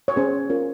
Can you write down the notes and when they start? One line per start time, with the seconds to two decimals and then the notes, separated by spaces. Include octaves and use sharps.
0.08 C#5
0.16 C#4 G#4 C5
0.50 C#4 F4 A#4